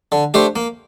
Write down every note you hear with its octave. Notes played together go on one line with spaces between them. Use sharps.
D3
A3 D4 G4 C5
A#3